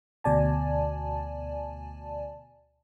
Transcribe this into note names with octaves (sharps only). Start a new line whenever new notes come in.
D2 B2 D5 G#5 A5